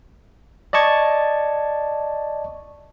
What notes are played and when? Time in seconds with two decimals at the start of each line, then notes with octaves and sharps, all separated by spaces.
0.73 D5 D#5 A5 C#6 G#6